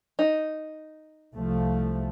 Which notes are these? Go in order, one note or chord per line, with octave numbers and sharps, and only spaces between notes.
D#4
C2 F3 A3